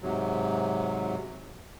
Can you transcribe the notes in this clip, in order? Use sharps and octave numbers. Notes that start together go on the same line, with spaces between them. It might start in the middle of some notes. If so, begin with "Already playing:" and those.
G#2 C3 F#3